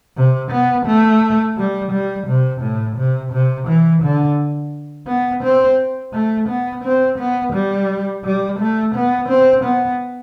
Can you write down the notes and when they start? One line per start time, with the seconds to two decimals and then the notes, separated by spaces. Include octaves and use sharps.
0.16 C3
0.52 B3
0.86 A3
1.57 G3
1.92 G3
2.27 C3
2.62 A2
2.97 C3
3.33 C3
3.68 E3
4.03 D3
5.07 B3
5.43 C4
6.13 A3
6.48 B3
6.84 C4
7.18 B3
7.54 G3
8.24 G3
8.59 A3
8.95 B3
9.29 C4
9.64 B3